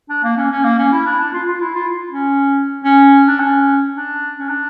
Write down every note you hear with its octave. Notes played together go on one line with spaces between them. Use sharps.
D4
A#3
C#4
C#4
A#3
C#4
E4
D4
D4
F4
F4
E4
F4
C#4
C#4
D4
C#4
D4
C#4
D4